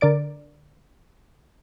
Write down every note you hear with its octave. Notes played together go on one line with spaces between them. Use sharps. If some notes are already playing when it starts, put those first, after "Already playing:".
D3 A#4 D5 A6 D7